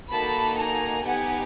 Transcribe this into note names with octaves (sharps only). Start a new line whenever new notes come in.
A#3 D#4 F#4 A4 A5 B5
G#5 A#5
B3 D#4 G4 F#5 G#5